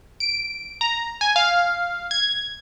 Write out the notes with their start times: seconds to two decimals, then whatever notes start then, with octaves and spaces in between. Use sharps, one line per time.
0.20 D7
0.81 A#5
1.21 G#5
1.36 F5
2.11 G#6